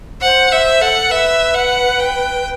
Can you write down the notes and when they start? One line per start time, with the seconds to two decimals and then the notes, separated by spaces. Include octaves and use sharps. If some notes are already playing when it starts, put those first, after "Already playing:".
0.22 C5 F#5
0.51 C5 E5
0.81 A4 F#5
1.10 B4 E5
1.54 F#5
1.99 G5